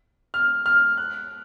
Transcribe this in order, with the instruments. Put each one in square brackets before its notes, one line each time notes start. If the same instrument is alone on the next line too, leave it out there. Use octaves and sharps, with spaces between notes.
[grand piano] F6
F6
F#6